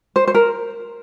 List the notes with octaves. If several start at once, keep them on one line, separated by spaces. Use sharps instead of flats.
C5
C5
A#4